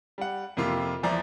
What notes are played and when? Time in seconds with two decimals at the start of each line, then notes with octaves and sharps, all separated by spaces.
0.18 G3 F#5
0.57 F2 C3 A#3 F4
1.03 E2 E3 F3 D5 E5 A#5